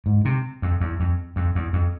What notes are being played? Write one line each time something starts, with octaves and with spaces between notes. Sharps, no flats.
G#2
C3
F2
E2
F2
F2
E2
F2